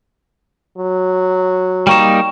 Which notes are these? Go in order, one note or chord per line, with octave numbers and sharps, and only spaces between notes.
F#3
G3 A#3 D#4 G5 C#6 E7